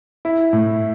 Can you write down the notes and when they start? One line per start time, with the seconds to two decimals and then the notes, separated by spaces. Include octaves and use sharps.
0.25 E4
0.53 A2